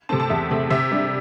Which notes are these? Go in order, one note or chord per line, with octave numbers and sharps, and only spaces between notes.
C3 A3 C4 A5
A5
E2 E5
C3 A3 C4
C3 E5
G3 D4